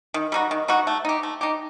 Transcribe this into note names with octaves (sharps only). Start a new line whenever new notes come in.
D#3
G3 D#4 F#4
D#3
G3 D#4 F#4
A3
D#4 G4
A3
D#4 G4